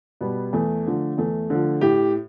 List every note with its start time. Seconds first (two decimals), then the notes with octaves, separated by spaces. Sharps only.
0.21 B2 G3 B3
0.53 E2 A3
0.86 D3 F3
1.18 E2 A3
1.50 D3 F3
1.81 A2 G4